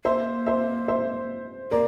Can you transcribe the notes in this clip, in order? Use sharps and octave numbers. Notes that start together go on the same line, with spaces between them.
A#3 C5 E5
C5 E5
C5 E5
A#3 A#4 D5